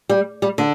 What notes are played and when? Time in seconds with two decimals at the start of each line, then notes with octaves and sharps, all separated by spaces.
0.09 G3
0.42 G3
0.58 D3